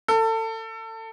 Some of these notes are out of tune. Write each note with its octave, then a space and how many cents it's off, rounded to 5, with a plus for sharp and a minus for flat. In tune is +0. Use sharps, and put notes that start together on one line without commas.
A4 +30